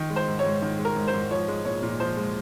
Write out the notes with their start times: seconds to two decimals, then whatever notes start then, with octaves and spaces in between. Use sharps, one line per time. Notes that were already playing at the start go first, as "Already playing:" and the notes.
Already playing: D#3
0.10 G#3
0.16 C5
0.28 G#2
0.39 C#5
0.44 G#2
0.62 D#3
0.79 G#3
0.85 A#4
0.96 G#2
1.08 C5
1.14 G#2
1.31 F3 C#5
1.48 G#3
1.65 A#2 C#5
1.82 A#2
2.00 F3 C5
2.17 G#3